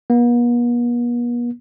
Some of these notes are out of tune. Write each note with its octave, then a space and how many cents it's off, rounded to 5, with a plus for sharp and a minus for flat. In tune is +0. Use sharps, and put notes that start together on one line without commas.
B3 -45